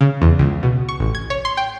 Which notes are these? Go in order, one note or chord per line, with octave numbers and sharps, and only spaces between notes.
C#3
E2
C#2
B2
C#6
A1
G#6
C#5
C6
G5